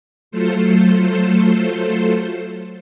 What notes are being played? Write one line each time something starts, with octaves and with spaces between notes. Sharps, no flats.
F#3 A3 F4 A4 C5